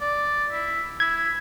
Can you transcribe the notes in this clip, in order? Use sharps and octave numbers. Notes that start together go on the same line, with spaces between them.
D5
E4
E4 G#6